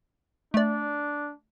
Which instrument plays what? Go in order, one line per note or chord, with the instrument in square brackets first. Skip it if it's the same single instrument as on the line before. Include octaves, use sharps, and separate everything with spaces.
[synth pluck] A3 D5 [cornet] D4